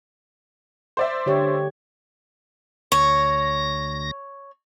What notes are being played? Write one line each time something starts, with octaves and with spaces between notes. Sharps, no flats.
C5 D5 E5
D3 G4 C#5
D2 C#5 A#6